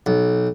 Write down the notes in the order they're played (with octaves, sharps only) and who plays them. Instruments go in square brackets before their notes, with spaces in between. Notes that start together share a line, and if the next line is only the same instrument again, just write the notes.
[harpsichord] B1